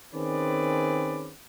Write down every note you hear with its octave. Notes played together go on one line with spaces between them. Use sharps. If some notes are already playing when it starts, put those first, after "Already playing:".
D#3 C4 C#4 G#4 B4 D5